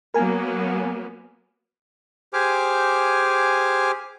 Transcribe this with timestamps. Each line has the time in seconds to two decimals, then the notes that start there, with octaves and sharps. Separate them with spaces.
0.14 F#3 A#3 B3 A#4 G#5
2.33 G4 G#4 C5 G#5 D6 F6